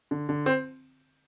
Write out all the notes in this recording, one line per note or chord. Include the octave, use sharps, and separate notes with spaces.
D3
D3
C4